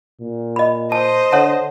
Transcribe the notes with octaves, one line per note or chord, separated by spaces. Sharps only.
A#2
D#5 B5
C5 D#5 A5
D3 C#5 F#5 A5